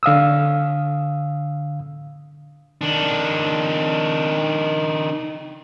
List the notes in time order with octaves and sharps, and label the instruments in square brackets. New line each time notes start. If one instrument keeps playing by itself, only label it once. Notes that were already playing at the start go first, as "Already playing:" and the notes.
[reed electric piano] D3 F5 D#6 E6
[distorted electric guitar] D#3 D4